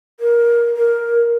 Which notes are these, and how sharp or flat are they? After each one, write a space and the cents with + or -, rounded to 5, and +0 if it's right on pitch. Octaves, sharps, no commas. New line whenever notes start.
A#4 +15
A#4 +10